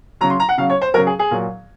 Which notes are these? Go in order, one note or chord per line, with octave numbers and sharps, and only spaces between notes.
C#3 F#3 A#5
C6
A#5
F#5
C#3 F#3 F5
C#5
C5
C#3 F#3 A#4
G#4
G#4
A#2 F#3